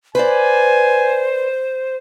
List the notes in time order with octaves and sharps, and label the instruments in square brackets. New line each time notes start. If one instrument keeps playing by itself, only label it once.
[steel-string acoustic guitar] B4 D5 [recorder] C5 [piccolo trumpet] G#5